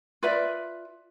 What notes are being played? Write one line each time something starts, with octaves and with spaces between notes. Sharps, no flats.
F4 B4 D5 E5